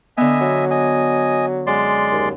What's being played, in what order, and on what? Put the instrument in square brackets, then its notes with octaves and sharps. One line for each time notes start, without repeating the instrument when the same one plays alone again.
[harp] D3 B3 [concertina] D#5 E5 G#5
[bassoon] F#3
[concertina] D#5 G#5
[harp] F#2 [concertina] G#3 D5 C6
[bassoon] D#2